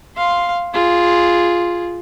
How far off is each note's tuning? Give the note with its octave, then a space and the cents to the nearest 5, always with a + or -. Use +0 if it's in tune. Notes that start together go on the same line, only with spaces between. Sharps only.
F5 +0 C6 +0
F4 +0 G#4 +0